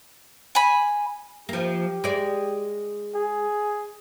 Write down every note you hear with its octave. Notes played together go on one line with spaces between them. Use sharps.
G#5 B5
F3 A#3 G4
G#3 D5
G#4